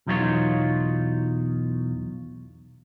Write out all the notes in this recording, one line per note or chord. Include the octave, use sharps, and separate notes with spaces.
B1 E2 F#3 D#4 F4 C#5